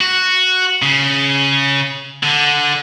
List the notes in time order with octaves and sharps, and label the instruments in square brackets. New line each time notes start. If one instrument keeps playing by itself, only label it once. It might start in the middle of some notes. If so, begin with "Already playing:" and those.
[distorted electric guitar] F#4
C#3
D3